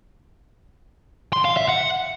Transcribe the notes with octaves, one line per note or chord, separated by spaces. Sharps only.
C6
F5
E5
F#5